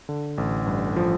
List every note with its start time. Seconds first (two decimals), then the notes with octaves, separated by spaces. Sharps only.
0.09 D3
0.38 A1
0.66 G2
0.96 F3